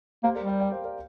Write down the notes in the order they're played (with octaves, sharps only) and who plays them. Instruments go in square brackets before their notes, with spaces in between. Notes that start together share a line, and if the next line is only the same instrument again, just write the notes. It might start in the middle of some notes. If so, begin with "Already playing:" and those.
[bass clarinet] A#3 [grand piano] G4 C5
[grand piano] A#4 D5
[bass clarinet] G3
[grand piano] D5 G5
D5 G5
C5 F5
A#4 D5